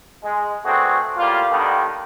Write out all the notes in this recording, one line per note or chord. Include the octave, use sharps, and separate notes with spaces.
G#3
A3 B3 C4 D4 F#4 G#4
A2 G3 A#3 F4
D3 D#3 G3 A#3 B3 D4